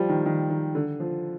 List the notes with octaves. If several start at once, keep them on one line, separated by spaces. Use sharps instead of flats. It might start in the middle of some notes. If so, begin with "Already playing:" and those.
Already playing: F3 G3
D#3
D#3
D#3
D3
F3